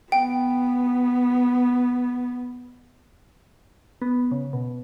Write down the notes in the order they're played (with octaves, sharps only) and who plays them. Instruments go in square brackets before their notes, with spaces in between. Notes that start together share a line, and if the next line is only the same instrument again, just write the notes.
[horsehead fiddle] B3 [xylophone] G5
[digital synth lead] B3
C#3
B2